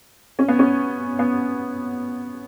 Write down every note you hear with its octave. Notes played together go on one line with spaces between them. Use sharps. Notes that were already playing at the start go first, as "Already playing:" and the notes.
C#4
B3
C#4
B3